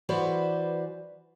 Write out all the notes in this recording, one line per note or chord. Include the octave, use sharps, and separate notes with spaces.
E3 F#4 B4 C5 D5